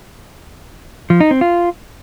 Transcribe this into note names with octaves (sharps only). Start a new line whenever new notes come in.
F3
D#4
C4
F4